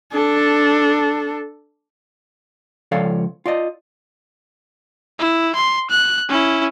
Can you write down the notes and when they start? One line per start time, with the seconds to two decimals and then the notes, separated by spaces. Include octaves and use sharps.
0.13 D4 A4
2.92 C#2 F3 A4 C#5 D5 F5
3.46 F4 D5 D#5
5.19 E4
5.55 C6
5.90 F#6
6.29 C#4 E4